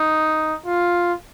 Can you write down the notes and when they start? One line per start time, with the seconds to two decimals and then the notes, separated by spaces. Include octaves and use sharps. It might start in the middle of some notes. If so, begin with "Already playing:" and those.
Already playing: D#4
0.66 F4